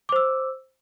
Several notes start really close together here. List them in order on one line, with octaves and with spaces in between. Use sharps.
D6 C5 E6